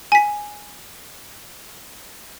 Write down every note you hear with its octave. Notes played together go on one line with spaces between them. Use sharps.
G#5 B6